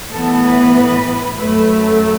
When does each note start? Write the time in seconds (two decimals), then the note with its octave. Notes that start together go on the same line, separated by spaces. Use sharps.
0.11 A2 E3 B3 A4
0.42 B4
0.74 B4
1.38 F#2 F#3 A3 B4